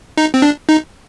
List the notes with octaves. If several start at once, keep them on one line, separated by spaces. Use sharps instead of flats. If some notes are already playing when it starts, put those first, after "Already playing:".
D#4
C4
D4
D#4